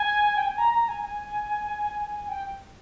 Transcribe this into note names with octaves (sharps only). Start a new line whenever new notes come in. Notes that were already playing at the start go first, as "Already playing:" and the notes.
Already playing: G#5
G5
G#5
A#5
A#5
G#5
G#5
G5